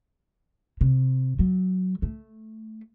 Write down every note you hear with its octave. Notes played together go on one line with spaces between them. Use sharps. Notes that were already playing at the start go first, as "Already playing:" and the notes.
C3
F#3
A3